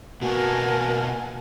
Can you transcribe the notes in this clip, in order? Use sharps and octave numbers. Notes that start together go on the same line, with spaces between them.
B2 A#3 B3 F#4 A#4 F#5 G#5 A5